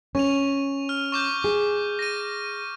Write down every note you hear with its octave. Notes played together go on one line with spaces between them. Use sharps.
C#4 C#6 D#7 F7
F6
C#6 D6 G6
G#4
A#6 D#7